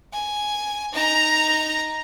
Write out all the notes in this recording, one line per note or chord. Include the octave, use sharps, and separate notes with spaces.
G#5
D#4 A#5